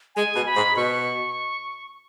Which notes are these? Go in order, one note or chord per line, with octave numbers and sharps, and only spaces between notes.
G#3 G#5
B2
B5
G#2
B2 C#6